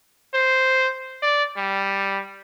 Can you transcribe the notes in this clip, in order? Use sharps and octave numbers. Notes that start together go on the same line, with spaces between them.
C5
D5
G3